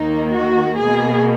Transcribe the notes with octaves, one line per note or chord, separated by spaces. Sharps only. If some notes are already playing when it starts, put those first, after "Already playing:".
Already playing: D#2 D#3 A#3 D#4
F#4
B2 A#3 G#4